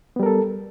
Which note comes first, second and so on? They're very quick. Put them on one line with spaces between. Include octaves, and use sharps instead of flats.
B3 G3 A#4 A4